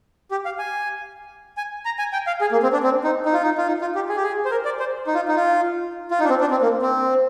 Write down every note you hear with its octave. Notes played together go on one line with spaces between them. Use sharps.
G4
F5
G#5
G#5
A#5
G#5
G5
F5
G#4
A#3
C4
D4
C4
D#4
D#4
F4
D#4
F4
D#4
F4
G4
G#4
G4
G#4
C5
A#4
D5
C5
D#4
F4
D#4
F4
F4
D#4
D4
C4
D4
C4
A#3
C4